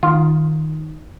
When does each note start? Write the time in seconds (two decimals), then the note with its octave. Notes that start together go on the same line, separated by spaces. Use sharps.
0.03 D#3 F4